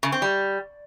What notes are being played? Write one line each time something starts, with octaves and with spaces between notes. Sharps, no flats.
C#3
C4
G3